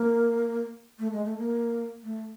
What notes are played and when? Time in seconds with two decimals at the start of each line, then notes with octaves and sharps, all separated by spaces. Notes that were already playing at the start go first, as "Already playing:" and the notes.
Already playing: A#3
0.99 A3
1.13 G#3
1.25 A3
1.38 A#3
2.03 A3